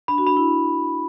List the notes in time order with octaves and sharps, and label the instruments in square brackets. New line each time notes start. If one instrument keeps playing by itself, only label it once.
[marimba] D4 [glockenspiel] B5
[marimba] F#4
[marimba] D4 [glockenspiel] B5
[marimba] E4